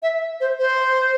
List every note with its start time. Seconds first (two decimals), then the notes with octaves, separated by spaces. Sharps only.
0.03 E5
0.40 C5
0.60 C5